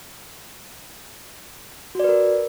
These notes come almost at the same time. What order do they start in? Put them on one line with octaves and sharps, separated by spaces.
F#4 D5 B4 A#4